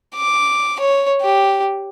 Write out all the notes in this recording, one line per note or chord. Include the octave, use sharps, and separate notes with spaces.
D6
C#5
G4